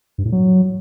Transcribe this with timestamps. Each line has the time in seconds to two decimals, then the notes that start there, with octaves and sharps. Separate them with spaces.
0.18 G2
0.25 A2
0.32 F#3